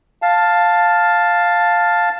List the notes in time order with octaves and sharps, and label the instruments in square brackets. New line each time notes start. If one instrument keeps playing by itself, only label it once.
[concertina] F5 A5